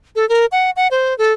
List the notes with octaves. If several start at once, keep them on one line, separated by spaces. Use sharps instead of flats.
A4
A#4
F#5
F#5
C5
A4